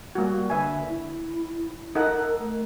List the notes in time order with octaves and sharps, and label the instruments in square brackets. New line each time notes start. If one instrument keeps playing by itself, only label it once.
[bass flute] G3 [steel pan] A#3 F#4
[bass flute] D3 [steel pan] B4 E5 G#5
[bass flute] E4
[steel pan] D#4 A4 F#5 [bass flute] A#4
[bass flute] A3